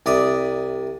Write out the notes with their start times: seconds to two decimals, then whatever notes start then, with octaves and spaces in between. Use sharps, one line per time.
0.06 C2 D5 E5 A#5 D#6